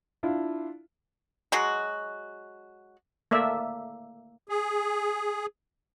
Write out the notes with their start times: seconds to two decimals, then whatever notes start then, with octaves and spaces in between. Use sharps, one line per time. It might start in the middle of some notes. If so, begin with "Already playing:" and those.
0.23 D4 E4 F4
1.52 F#3 G#3 F#4
3.31 A3 A#3 D5 E5
4.49 G#4